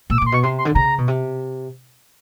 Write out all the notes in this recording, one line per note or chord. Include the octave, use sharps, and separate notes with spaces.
A#2 E6
D6
A#2 C6
B2 C#6
C3 C6
C6
D3
C#3 A#5
B2
C3